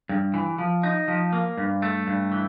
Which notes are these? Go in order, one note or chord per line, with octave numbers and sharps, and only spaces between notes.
G2
E3
F3
D#4
F3
A#3
G2
A3
G2
E3